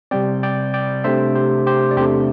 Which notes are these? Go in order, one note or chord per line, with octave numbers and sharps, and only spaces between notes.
C3 G3 C4 D5 G5
D5 G5
D5 G5
C3 A3 D4 C5 E5
G4 C5
G4 C5
D5
E2 C3 A3 D4 G4 C5